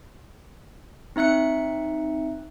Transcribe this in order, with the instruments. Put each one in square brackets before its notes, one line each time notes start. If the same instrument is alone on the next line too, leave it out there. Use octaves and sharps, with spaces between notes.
[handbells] C4 D#4 E5 F#6 C#7